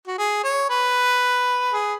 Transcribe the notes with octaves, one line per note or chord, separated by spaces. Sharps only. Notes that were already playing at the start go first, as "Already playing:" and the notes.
F#4
G#4
C#5
B4
G#4